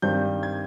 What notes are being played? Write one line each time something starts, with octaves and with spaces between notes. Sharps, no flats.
G2 D#3 G3 C4 G6
G#6